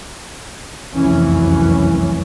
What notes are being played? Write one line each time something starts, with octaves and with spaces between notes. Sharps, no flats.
F1 C2 F#2 E3 C#4